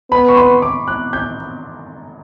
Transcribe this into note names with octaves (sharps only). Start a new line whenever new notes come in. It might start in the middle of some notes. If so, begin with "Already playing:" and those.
B3 B5
C#6
C6
D6
F#6
G6